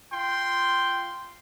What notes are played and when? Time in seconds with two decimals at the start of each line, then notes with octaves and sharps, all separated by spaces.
0.13 F4 G5 C6